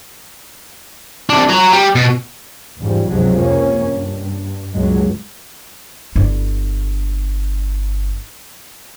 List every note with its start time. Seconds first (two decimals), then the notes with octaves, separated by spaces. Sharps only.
1.30 C3 D4
1.49 F#4 A#5
1.73 G3
1.95 B2
2.79 E2 G#2 C#3 F3 G3
3.09 C#2 G2 C3 F3 F#3 G#3
3.40 F2 A#3 C#4
3.87 G2
4.74 C#2 G2 A#2 F#3 G#3
6.16 G1 E4